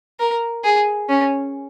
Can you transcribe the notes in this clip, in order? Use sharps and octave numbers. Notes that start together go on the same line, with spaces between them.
A#4
G#4
C#4